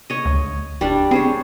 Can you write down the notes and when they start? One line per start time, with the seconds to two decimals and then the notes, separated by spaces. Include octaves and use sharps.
0.10 C#5 D#5
0.25 D2
0.81 D#1 G3 D4
1.11 C4 G#4 C5 C#5